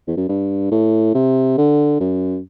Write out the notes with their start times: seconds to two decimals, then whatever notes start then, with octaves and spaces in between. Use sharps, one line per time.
0.08 E2
0.17 F#2
0.29 G2
0.71 A2
1.14 C3
1.58 D3
2.00 F#2